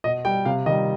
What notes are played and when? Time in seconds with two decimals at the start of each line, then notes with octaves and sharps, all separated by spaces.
0.04 B2 D#5
0.25 G3 G5
0.45 C3 F5
0.66 D#3 D#5
0.70 G3